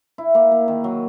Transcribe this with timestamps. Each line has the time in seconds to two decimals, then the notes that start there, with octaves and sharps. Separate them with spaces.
0.18 E4
0.35 A#3
0.51 A#3
0.68 D#3
0.84 F#3